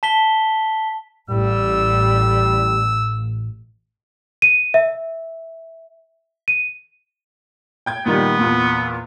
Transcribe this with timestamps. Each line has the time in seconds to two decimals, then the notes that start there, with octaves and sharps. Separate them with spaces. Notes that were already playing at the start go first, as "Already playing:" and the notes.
0.03 A5 B6 G7
1.30 A1 G3 E6
4.42 D#7
4.74 E5
6.48 D#7
7.86 G5 G6 G#6
8.06 A#2 D#3 G3 B3
8.39 E2 A#2